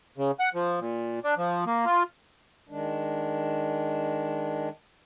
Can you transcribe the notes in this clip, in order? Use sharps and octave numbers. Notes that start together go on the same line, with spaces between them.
C#3
F#5
F3
A#2
D4
F3
A#3
F4
D#3 G#3 D4